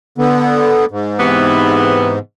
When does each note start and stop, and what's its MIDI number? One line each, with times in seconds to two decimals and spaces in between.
0.18 0.85 50
0.18 0.85 59
0.91 2.19 44
1.20 2.17 48
1.20 2.17 52
1.20 2.17 59